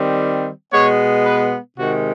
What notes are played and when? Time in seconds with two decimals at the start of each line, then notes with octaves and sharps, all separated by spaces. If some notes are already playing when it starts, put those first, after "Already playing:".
Already playing: D#3 G3 C4
0.71 B2 G#3 B3 C#5
1.25 B4
1.78 C3 D#3 G#3 F#4